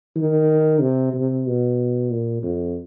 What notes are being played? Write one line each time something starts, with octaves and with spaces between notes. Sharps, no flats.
D#3
C3
C3
B2
A#2
F2